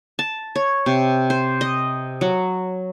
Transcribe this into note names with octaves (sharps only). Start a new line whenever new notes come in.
A5
C#5
C3
C5
D#5
F#3